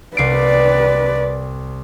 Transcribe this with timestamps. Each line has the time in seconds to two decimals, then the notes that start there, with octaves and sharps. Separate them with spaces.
0.17 C2 B4 D5 C7 D7